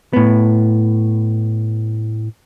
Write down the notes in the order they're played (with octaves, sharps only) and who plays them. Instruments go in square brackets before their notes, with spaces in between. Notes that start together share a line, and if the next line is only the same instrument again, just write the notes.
[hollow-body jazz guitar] A2 B3